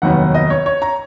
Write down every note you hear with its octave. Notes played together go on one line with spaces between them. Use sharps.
F1 D#2 D#3 F#3 B3 F#5
D#5
C#5
C#5
A#5